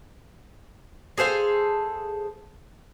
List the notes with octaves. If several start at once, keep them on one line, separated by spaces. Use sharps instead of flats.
G#4 A4 C5 F5